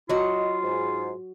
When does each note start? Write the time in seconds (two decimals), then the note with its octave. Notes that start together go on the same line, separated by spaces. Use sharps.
0.09 F#3 F4 D#5 F#5
0.62 G#2